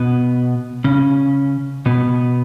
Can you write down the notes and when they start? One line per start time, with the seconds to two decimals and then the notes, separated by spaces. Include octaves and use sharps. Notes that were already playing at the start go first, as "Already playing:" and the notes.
Already playing: B2 B3
0.84 C#3 C#4
1.86 B2 B3